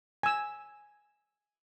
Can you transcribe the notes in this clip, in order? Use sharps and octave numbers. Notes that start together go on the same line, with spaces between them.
G#5 E6